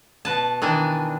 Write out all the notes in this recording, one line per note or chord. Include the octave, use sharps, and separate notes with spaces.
B2 B4 A5
D#3 E3 D4